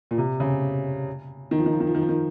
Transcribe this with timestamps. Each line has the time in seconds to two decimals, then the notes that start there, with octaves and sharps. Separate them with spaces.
0.11 A#2
0.18 C3
0.40 C#3
1.51 D#3
1.59 F3
1.66 D#3
1.73 F3
1.80 D#3
1.87 F3
1.95 D#3
2.02 F3
2.09 D#3